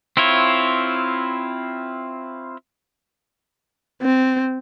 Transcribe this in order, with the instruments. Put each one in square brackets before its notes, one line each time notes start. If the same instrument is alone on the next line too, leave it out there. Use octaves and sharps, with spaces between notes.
[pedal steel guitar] C4 E4 F4 C#5
[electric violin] C4